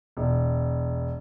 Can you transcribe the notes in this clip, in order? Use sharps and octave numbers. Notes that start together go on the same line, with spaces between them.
E1